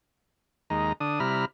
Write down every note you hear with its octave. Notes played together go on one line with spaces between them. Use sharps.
D#2 G#3 D#4 A#5
D3 D4 D#6
C3 G3 E4 A#5 B5 F6